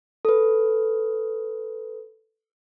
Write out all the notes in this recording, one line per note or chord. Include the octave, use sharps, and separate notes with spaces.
A4 B4